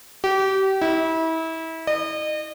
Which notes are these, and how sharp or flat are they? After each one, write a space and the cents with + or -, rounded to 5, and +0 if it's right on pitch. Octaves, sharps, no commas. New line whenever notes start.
G4 -30
E4 -30
D#5 -35